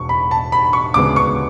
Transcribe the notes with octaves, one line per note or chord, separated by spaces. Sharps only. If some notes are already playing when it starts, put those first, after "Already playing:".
Already playing: E1 E2 B2 C#6
B5
A5
B5
C#6
D2 C#3 G#3 B3 D6
C#6